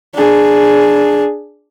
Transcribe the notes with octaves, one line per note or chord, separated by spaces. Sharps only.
D4 G#4